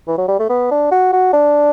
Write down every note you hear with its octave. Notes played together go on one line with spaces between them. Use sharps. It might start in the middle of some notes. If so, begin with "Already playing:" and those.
E3
F#3
G3
A3
B3
D4
F#4
F#4
D4